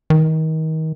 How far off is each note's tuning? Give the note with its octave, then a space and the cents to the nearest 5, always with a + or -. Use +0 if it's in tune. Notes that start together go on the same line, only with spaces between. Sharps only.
D#3 +30